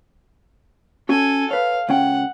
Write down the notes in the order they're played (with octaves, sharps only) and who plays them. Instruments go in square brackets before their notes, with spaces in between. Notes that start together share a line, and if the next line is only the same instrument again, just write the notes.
[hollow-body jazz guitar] C#4 F#4 [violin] A4 G#5
[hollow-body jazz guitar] B4 C#5 [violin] F5
[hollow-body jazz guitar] C#2 C#4 G5 [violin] F#5